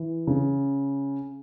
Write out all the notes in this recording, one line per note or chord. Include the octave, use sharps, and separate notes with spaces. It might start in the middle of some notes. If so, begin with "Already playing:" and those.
Already playing: E3
C#3